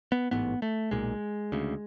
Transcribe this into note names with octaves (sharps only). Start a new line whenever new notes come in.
B3
A1 G#2 B3
A3
B1 A#2 G#3
D2 C#3